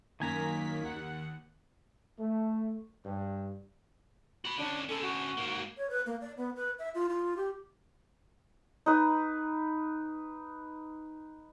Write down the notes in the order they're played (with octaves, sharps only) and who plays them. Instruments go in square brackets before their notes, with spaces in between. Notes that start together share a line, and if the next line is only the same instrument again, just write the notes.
[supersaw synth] F#2 A#3 B6 [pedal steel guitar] D#3 G#5 A#5
[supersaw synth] D#2 F#5
[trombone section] A3
G2
[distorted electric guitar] F#4 B5
[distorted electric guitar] D3 C#4 [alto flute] D4
[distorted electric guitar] D3 C#4 [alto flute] A4
[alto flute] F#4
[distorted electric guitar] G#2 A#3
[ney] C#5
B4
A#3
D5
B3
B4
E5
F4
F4
G4
[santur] D#4 B4